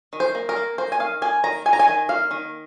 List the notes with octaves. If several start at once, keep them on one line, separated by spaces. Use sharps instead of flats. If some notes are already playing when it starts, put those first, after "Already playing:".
D#3
C5
A#3
A#4
A#3
A#3 C5
G#5
D#3 F5
A#3 G#5
D#3 A#5
D#4 G#5
A#5
G#5
D#3
A#3 F5
D#3